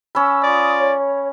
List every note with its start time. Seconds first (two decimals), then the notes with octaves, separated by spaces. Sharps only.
0.15 C#4 B5 E6
0.43 F4 D5 D#6
0.80 C#5